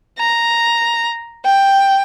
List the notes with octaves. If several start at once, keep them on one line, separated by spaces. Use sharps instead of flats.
A#5
G5